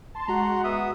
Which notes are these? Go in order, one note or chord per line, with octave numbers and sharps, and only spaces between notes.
A5 C6
G#3 F#4 F#5 A#5 C6
B3 E5 D#6